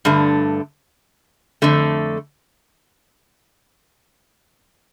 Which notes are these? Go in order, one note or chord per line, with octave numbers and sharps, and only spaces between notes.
G2 D3 A3
F2 D3 A3